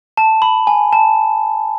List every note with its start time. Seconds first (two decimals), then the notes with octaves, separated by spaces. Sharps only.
0.17 A5
0.42 B5
0.67 G#5
0.93 A5